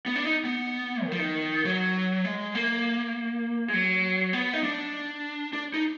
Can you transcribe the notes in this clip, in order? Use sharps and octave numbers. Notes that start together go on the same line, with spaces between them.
B3
D4
D#4
B3
D#3
F3
D#3
F#3
G#3
A#3
G#3
F#3
B3
D#4
D4
D4
D#4